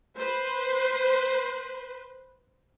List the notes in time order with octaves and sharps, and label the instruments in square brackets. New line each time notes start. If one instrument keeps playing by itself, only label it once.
[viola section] B4 C5